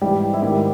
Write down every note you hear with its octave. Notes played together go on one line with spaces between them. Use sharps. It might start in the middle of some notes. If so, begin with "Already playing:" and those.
G#2 E3 G3 G4
E4
G#2 D#3 G3 G4